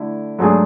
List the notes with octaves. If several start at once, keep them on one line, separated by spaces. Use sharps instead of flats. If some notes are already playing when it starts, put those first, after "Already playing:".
Already playing: D3 A3 E4
G#2 F#3 A3 D4 G#4